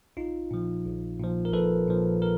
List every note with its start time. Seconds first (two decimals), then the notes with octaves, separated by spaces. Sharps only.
0.17 A#1 D#4 F4
0.51 A#2 F3
0.86 A#1
1.20 A#2 F3
1.45 A#4
1.53 A#1 A4 B4
1.88 A#2 F3
2.22 A#4